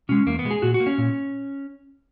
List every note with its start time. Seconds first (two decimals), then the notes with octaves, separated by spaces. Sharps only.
0.09 B2 G#3 C#4
0.27 E2 A#3
0.39 B3
0.44 B2 G#3
0.51 G#4
0.62 A#2 F#4
0.74 F#4
0.80 A#3
0.87 C#4
0.98 A#2